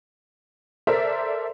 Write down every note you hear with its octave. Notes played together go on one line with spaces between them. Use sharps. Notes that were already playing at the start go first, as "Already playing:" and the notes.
A4 A#4 C5 D5 E5